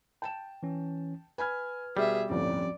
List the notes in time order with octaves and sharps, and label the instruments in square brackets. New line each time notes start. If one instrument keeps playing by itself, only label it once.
[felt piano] G5 A5 E7
[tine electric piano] E3 C#4
[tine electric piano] B4 F6 [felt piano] G#5 B5 G#6
[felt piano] B2 [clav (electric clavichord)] G3 [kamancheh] G#4 E5
[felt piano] G1 D#2 A2 [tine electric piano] F3 C4 C#4 [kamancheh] D5